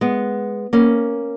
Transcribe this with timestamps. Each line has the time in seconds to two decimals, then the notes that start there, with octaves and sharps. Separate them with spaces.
0.01 G#3 B3
0.73 A#3 C#4